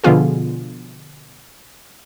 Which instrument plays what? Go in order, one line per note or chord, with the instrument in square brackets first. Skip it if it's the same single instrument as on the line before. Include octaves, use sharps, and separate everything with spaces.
[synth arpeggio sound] B2 D3 F3 B3 F4 G#4